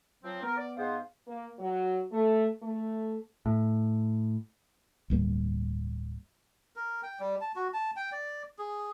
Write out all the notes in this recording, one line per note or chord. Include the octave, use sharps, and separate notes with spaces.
F3 F#3 C4
B3 A#4
D5
G#2 B3 C5 F5
A#3
F#3
A3
A3
A2
D1 G2 A#3
A#4
G5
G3
A5
F#4
A5
G5
D5
G#4